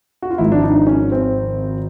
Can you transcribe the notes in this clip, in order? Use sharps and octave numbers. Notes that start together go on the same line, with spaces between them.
F#4
F4
G#1 G#2 F3 E4
D4
D#4
C#4
C4